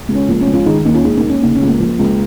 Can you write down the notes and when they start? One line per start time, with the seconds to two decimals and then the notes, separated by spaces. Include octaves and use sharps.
0.09 C#2
0.15 C#4
0.29 F3 A#3
0.41 C#4
0.47 C#2
0.53 C#4 F4
0.66 D#3 D#4 G#4
0.85 D#2 A#3 D#4
0.94 C#4 F4
1.04 G#3 D#4 G#4
1.17 A#3 D#4
1.24 D#2
1.29 C#4
1.42 C#3 A#3 D#4
1.55 C#4
1.62 C#2
1.68 A#3
1.80 F3
1.99 C#2